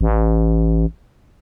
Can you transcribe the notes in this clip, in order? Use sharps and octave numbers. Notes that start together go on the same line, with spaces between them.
A1